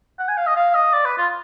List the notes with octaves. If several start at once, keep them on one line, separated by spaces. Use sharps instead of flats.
F#5
G#5
F5
D#5
F5
D#5
D5
B4
F4